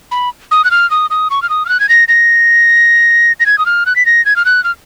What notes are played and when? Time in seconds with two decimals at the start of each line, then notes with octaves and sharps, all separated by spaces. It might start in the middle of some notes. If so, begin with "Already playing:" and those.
0.11 B5
0.51 D#6
0.64 F#6
0.71 F6
0.91 D#6
1.10 D#6
1.30 C#6
1.42 F6
1.50 D#6
1.66 F6
1.69 F#6
1.80 G#6
1.89 A#6
2.08 A#6
3.40 A#6
3.46 G#6
3.58 D#6
3.66 F6
3.86 F#6
3.96 B6
4.06 A#6
4.26 G#6
4.36 F6
4.45 F#6
4.64 F6